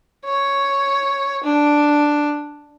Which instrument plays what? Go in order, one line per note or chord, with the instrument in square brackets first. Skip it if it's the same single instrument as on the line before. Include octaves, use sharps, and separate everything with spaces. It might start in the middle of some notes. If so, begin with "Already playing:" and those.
[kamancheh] C#5
D4